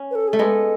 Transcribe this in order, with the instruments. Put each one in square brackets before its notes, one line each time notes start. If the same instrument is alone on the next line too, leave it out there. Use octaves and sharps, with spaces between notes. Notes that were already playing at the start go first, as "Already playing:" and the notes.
Already playing: [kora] C#4
[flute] B4
A4
G#4
[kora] A3 [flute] A4
[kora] G#3 B3